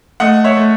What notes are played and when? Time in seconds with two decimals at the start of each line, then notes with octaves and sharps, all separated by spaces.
0.20 A3 D#5 F#5
0.44 C#5 E5
0.57 A3